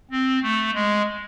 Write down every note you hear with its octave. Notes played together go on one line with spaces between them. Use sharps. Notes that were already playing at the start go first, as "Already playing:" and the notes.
C4
A3
G#3